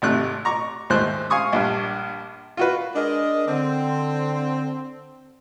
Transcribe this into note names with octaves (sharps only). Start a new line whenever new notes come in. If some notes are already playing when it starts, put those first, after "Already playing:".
G#1 C3 A3 F#6
A#5 C#6 D6
D#2 G#2 A3 C5 F#6
F5 G#5 C#6 D#6
A#1 G2
F4 F#4 B4
G#3 D4 A#4 D#5
D3 C4